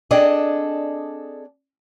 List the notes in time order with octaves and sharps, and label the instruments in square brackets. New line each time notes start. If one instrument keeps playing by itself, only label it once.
[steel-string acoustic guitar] C4 D4 G#4 A4 D5 D#5